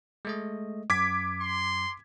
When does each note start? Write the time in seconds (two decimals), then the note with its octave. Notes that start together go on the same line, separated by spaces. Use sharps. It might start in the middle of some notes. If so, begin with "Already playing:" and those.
0.25 G#3 A3 D#5
0.90 F#2 D6 G#6 B6
1.42 C6